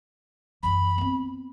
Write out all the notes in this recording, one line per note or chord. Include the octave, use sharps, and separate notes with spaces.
F#2 E3 B5
B3 C4